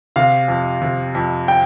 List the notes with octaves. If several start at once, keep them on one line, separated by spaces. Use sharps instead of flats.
C3 F5
F2
C3
F2
G5